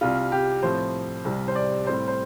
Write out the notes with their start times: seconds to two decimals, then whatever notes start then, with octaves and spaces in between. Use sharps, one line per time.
0.01 C2 C3 G3 F4
0.32 G4
0.63 A2 F3 C4 C5
1.25 C2 C3 G3 C4
1.48 C5
1.55 D5
1.86 A2 G3 C4 C5
2.08 C5